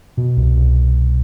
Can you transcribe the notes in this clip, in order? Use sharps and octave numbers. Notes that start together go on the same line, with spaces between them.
B2
C2
C2